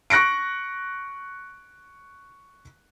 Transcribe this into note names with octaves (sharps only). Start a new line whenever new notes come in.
C#6 F#6 A#6 C#7 D7